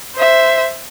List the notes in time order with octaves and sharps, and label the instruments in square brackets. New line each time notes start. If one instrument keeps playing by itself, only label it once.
[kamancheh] C5 E5